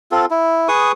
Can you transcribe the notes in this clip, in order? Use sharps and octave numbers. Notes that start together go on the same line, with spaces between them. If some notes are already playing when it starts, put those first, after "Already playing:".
C4 F4 A4
E4
G#4 B4 C#6 D#6